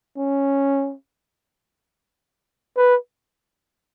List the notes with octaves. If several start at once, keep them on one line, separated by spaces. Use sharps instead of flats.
C#4
B4